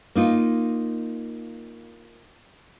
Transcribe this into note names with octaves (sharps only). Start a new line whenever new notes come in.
A#3 D#4 F4